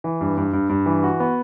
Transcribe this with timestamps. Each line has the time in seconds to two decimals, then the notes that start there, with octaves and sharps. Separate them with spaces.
0.04 E3
0.21 G2
0.37 G2
0.53 G2
0.69 G2
0.86 E3
1.03 F#4
1.20 B3